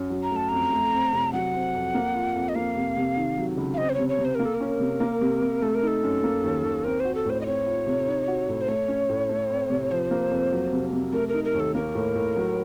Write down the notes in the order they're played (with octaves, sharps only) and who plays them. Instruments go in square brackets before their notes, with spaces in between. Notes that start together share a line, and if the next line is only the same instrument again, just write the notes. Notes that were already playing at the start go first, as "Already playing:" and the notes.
Already playing: [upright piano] F#2
F#3
[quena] A#5
[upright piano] A3 [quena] A5
[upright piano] F2 [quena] A#5
[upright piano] A3
C4
C2
[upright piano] F#3 [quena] F#5
[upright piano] C4
F2
A#3
F4
F2
[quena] D#5
[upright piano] A#3 [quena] F5
[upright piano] C3
C3
D#3
F#3
C#2
[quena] F5
[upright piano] C4 [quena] D#5
[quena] C5
[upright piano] C3 [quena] C#5
[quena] C#5
[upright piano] C3
[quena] C5
[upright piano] A#3 [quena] A#4
[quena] A4
A#4
[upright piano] C#4
C3
A#3
C3
C3
[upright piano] A3 [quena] A4
[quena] A#4
[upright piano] D#4 [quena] A4
[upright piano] F#2
A#3
D#2
D#2
[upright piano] C4 [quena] A#4
[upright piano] F#4 [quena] C5
[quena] A4
[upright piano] A2 [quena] C5
[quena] D#5
[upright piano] C4 [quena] C#5
[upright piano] F4
C3
D#4
F#4
A2
[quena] C5
[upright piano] A3 [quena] C#5
[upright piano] C#4
A2
A3
C4
C3
[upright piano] F3 [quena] C5
[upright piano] A#3
F2
F#3
C3
C3
[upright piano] A3 [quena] A#4
[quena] A#4
[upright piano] D#4
[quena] A#4
[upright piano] D#2
[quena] A4
[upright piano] A#3 [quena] A#4
[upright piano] A2
A2
F#3